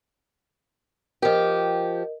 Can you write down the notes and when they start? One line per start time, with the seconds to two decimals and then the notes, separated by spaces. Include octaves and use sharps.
1.22 F3 G4 A#4 D#5